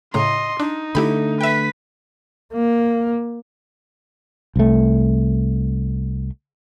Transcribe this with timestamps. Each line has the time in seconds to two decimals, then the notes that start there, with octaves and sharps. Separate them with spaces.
0.14 A2 C#3 D#5 A#5 C6
0.60 D4 D#4
0.95 D3 A3 E4 G4 B5
1.41 B4 E5 G5 B6
2.53 A#3
4.56 C2 A3